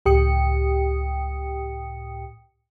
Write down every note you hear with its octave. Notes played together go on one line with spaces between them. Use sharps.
C#2 A2 G4 G5 D#6 C#7